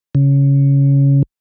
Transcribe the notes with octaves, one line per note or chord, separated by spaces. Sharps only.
C#3